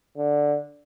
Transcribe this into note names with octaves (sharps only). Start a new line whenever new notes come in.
D3